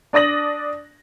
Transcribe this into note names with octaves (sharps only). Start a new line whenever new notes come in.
D4 D5 D#6 A#6 F#7